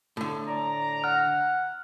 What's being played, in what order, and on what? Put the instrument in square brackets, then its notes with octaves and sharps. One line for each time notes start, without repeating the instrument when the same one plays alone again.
[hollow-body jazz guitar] A2 D3
[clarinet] D5 [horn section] A#5
[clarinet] F#5 [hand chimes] F6